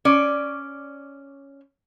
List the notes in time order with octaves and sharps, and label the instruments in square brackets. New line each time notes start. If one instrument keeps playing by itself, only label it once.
[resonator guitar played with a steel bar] C#4 D5